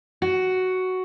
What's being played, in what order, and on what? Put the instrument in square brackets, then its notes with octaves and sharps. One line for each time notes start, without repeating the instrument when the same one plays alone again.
[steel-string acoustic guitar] F#4